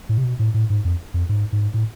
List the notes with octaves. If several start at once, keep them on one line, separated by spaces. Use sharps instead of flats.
A2
C3
B2
A2
A2
G#2
F2
F2
G#2
G#2
A2